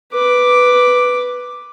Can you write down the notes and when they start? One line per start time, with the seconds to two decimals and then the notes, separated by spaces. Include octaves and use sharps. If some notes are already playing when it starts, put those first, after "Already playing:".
0.13 B4 D6